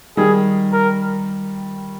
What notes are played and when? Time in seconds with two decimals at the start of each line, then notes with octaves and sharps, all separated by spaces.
0.17 D#3 G3 G#4
0.72 A#4